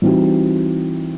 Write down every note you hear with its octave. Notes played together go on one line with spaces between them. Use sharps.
E3 G3 C4 D#4 F#4